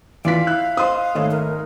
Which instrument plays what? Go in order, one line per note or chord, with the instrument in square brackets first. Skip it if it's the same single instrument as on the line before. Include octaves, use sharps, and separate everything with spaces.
[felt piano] E2 F4 B6 [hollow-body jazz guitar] D5 [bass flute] F5
[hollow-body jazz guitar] E4 [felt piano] F#6
[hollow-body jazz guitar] C5 D#5 [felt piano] C6 D#6
[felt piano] G#1 [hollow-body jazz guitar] A3 C#5 D#5
[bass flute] A#4